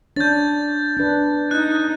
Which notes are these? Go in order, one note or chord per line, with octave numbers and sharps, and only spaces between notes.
D4 C#5 G6 A6
D4 B4
D#4 F#6